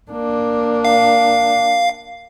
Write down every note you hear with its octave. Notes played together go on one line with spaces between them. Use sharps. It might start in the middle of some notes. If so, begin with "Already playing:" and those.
A#3 D4
F5